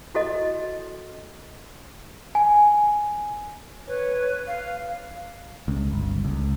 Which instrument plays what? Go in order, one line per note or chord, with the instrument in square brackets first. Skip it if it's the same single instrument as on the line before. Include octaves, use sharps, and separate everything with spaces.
[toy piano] E4 F#4 A4 D#5
[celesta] G#5
[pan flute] B4 [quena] C#5
[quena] F5
[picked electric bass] C#2
G1
C#2